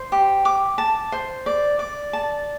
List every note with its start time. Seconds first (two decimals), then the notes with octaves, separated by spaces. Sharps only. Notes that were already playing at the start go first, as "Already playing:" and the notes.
Already playing: C5
0.12 G4
0.45 D6
0.78 A5
1.12 C5
1.46 D5
1.79 D5
2.13 A5